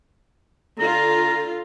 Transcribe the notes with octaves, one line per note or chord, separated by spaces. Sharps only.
D3 F4 A#5